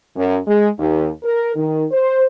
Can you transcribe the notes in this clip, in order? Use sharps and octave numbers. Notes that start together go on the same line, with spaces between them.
F#2
G#3
D#2
A#4
D#3
C5